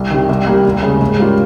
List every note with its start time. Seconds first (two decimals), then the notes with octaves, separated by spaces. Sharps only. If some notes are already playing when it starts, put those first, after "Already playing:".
Already playing: C2
0.10 C3 D#3
0.29 C2
0.47 C3 G3 A#3
0.65 D#2
0.83 C#3 G#3
1.01 G#2
1.19 G3 A#3 C#4 F4